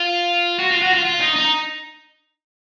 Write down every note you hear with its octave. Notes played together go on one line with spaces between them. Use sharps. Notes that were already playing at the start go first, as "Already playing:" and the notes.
Already playing: F4
F#4
F4
F#4
F4
F4
D#4
D#4